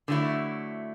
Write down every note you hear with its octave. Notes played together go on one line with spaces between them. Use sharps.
D3 F#3 A3 E4